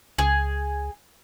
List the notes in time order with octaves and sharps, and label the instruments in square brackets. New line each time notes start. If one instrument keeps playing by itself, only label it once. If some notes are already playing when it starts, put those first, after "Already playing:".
[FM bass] C#2 [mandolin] G#4